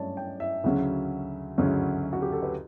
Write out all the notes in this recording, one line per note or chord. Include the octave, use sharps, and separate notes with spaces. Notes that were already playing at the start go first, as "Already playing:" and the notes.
Already playing: G2 F#3 A3 C#4 C#5 D5 A5
G5
E5
D2 C#3 F#3 C#4
D2 C#3 F#3 C#4
F#4
G4
A4
B4